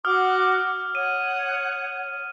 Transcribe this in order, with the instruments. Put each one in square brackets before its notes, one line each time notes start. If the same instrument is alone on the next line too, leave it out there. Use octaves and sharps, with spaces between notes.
[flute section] F#4 F#5 D6 [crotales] D#6 F6
[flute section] C#5 F#5 D#6 [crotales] D#7